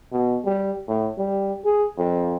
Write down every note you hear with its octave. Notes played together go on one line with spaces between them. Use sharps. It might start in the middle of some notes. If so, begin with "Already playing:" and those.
B2
G3
A2
G3
G#4
F2